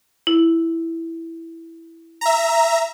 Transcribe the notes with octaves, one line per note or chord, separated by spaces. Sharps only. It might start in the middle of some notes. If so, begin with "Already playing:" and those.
E4
E5 A#5